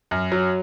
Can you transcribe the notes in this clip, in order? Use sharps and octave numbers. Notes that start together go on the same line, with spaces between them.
F#2
F#3